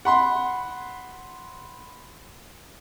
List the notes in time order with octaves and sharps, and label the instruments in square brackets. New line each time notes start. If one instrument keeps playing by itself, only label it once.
[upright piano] F#5 B5 C6